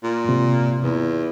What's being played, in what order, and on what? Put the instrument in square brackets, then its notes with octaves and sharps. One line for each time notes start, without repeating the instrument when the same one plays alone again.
[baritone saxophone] A#2
[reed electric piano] G#2 C3
[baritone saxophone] E2